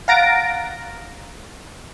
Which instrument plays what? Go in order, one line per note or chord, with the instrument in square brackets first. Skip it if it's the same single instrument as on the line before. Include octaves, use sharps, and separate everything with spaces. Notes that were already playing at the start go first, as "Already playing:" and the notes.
[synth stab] F5 F#5 A#5 A6 A#6 D7